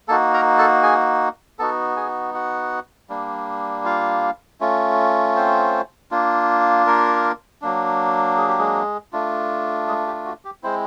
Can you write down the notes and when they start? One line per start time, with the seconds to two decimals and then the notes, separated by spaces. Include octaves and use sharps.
0.08 A#3 D#4 F#4 A4 A5
0.34 A#4 A#5
0.58 A4 A5
0.83 G#4 G#5
1.59 B3 D#4 F#4 A4 A5
1.97 G#4 G#5
2.34 F#4 F#5
3.09 G3 A#3 D4
3.85 F4 F5
4.61 A3 C#4 F4
5.35 C4 C5
6.11 A#3 D4 F4
6.87 A#3 A#4
7.62 F#3 A#3 D4
8.37 G#4
8.48 G4
8.58 G#3 G#4
9.13 A3 D4 F4
9.88 G#3 G#4
10.07 G4
10.26 F#4
10.45 G4
10.63 G#3 C4 E4 C5